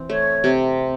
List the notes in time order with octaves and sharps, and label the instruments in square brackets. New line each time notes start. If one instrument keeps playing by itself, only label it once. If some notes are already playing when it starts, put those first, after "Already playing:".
Already playing: [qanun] E3 C4
[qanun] A3 [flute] C#5
[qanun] C3